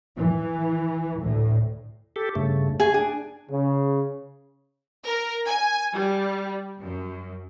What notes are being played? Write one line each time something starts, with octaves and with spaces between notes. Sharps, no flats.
E3
D2 A2
G4 A4
G2 C#3 A3
A3 G#4 G#5
D4 G#4
C#3
A#4
G#5
G3
F#2